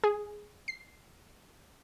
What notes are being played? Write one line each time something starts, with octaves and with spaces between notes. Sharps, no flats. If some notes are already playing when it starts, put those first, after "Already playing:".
G#4
C7